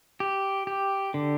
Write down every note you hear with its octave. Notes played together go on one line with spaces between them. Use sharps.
G4
G4
D3